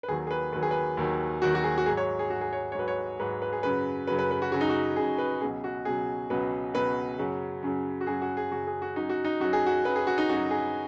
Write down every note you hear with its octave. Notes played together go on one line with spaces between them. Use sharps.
B4
D#2 D#3 F#3 G#4
G#4
B4
D#2 D#3 F#3 B4
G#4
B4
D#2 D#3 F#3
D#2 D#3 F#3 F#4
F#4
G#4
F#4
G#2 F#3 G#4
C#5
G#4
G#2 F#3 F#4
G#4
C#5
C#5
G#2 F#3 B4
C#5
G#2 F#3 B4
B4
G#4
F#2 C#3 F#3 B4
F#2 C#3 F#3 B4
B4
B4
F#4
F#2 C#3 F#3 F#4
D#4
F#4
F#2 C#3 F#3 G#4
B4
C#2 B2 F#3 G#4
F#4
C#2 B2 F#3 G#4
C#2 B2 F#3 B4
C#2 B2 F#3 B4
F#2 C#3 F#3
F#2 C#3 F#3
F#4
F#2 C#3 F#3 G#4
F#4
G#4
F#2 C#3 F#3 F#4
G#4
F#4
F#2 F#3 D#4
F#4
D#4
F#2 F#3 F#4
G#4
F#4
F#2 F#3 B4
G#4
F#4
D#4
F#2 F#3 F#4
G#4